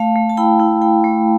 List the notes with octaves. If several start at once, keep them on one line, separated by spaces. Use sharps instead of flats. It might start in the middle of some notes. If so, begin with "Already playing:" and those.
Already playing: A3 F5 A5
A3
A5
E4 G5 B5
E4
A3 G5 B5
A3